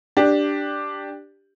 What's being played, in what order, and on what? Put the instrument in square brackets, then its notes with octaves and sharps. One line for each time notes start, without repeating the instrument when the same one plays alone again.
[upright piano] D4 G4